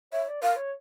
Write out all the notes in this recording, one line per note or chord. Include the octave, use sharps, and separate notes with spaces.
C#5 E5
D5
A#4 F5
C#5